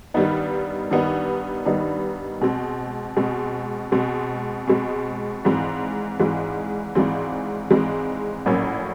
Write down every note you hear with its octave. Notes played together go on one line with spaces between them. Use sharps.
G2 D#3 G3 B3 D#4
G2 D#3 G3 B3 D#4
G2 D#3 G3 B3 D#4
B2 G#3 C4
B2 G#3 C4
B2 G#3 C4
B2 G#3 C4
G#1 G#2 E3 G#3 C4
G#1 G#2 E3 G#3 C4
G#1 G#2 E3 G#3 C4
G#1 G#2 E3 G#3 C4
A#1 A2 F#3 A#3 C#4